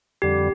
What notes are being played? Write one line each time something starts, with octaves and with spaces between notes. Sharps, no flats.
F2 D3 G3 G4